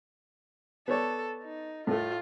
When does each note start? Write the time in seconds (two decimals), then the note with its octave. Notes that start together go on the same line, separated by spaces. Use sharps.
0.88 B3 A4 C#5 D5
1.44 D#4
1.87 A2 A3 F4